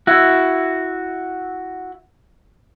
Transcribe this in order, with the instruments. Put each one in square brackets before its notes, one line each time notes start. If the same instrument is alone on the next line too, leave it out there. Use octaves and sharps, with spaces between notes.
[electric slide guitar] E4 F#4